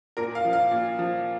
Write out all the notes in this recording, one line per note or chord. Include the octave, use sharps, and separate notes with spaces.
A#2 A#4
F5
F3
F5
A#2
F3